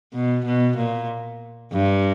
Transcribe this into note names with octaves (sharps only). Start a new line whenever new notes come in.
B2
B2
A#2
G2